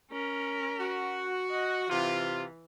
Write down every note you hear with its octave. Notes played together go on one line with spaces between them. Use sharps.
C#4 A#4
F#4
D#5 F#5
C3 E3 F4